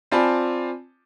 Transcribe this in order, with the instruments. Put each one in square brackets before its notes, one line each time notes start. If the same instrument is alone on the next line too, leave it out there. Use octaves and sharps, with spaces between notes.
[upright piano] C4 F4 D5 G#5 A5 B5